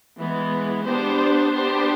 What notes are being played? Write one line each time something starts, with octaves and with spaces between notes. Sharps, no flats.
E3 G#3 B3
B3 D4 G4 C5
B3 D4 G4 C5